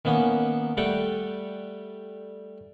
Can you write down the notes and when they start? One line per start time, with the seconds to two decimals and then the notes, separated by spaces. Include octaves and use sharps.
0.05 D#3 A#3 B3 C#4
0.77 G3 A3 F#5 G5